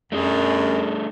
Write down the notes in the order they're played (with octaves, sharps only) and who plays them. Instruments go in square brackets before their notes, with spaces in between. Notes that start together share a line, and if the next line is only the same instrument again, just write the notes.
[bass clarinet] F#2 [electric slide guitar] A3 D4 G#4